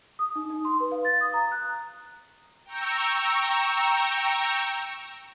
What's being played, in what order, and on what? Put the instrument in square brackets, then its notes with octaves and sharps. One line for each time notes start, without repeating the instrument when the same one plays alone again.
[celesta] D#6
D#4
D#4
C6
B4
F5
A6
D#6
A#5
F#6
[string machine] G5 A#5 C#6 E6